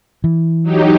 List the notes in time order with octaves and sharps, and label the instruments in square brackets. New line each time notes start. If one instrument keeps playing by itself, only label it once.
[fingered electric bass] E3
[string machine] F#3 D#4 G4